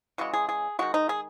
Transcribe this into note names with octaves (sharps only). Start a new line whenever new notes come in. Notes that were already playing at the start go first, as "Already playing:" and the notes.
C#3 E3 G#3 F#4
G#4
G#4
D#3 G#3 F#4
D#4
G#4